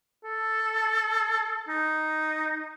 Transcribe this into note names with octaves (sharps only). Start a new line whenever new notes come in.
A4
D#4